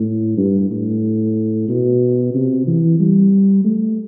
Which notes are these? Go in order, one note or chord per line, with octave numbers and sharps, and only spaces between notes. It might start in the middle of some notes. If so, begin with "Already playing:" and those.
Already playing: A2
G2
A2
B2
C3
E3
G3
A3